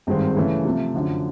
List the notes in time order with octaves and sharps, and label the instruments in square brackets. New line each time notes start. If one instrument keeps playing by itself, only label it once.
[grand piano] G#1 G2 D#3 G#3 C4
C#3 E3 A3 C#4
C3 F3 A3
F#2 D3 F3